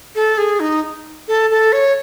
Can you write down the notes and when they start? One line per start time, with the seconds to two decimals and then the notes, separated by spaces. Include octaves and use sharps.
0.15 A4
0.38 G#4
0.60 D#4
1.28 A4
1.50 A4
1.73 C#5